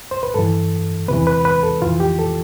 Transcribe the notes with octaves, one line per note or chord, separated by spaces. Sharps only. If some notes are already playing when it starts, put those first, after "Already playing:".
C5
B4
G2 E3 A4
E2 C3 E3 B4
B4
B4
A4
F2 E3 F4
G4
A4